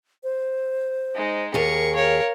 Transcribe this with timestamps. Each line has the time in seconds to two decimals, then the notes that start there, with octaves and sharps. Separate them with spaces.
0.24 C5
1.15 G#3 D#4
1.54 D#2 G#4 A#4 C#6
1.96 A#4 C#5 F5